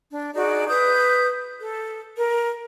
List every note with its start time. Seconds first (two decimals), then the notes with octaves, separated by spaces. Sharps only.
0.11 D4
0.34 D#4 F#4 G#4 D5
0.68 B4 D#6 G6
1.60 A4
2.18 A#4